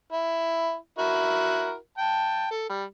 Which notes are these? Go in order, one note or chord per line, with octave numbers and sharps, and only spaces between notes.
E4
E4 F#4 A#4
G5 A5
A4
G3